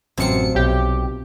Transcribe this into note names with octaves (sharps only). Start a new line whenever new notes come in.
A1 F#2 C3 F3 C4 C#7
B1 G4